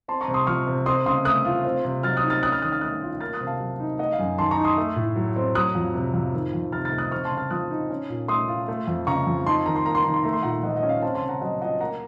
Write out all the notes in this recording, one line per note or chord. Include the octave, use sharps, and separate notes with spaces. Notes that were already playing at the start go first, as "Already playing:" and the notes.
C4 A5 C6
A#5 C#6
C3
C6 D#6
F3 C#6 F6
C3
C4 C6 D#6
C#3 C6 D#6
A3 D#6 F#6
F4
C4
C3
F#3 F6 A6
D#6 F#6
D#4
F6 A6
C#4 D#6 F#6
F6 A6
D#3 D#6 F#6
F6 A6
A3 D#6 F#6
F4
A#3 F6 A6
D#6 F#6
C3
F5 A5
F#3
D#4
A3 D#5 F#5
F5
F#2
D#3 A5 C6
A#5 C#6
D#4
C6 D#6
A3
A2
F#3
C4
F#3 D#6 F#6
F2
C3
F2
D#3
F2
C3 F6 A6
F6 A6
A3
D#6 F#6
C4 C#6 F6
A5 C6
C#3
F6 A6
F3 D#6 F#6
D#4
C#4
A#2
A3 C6 D#6
F4
A3
F2
C#3 A#5 C#6
F2
D#4 A5 C6
D#3 A#5
C6
A#3 A#5
C6
D#3 A#5
C6
A3 A#5
C6
A#2 F#5 A#5
F3 D#5 F#5
D#5 F#5
C#4
F5
C4 F5 A5
A5 C6
C#3
F#5 A#5
F#3 D#5 F#5
F4 D#5 F#5
A#3 F#5 A#5